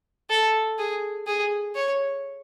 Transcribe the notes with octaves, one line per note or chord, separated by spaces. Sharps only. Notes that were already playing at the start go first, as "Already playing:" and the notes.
A4
G#4
G#4
C#5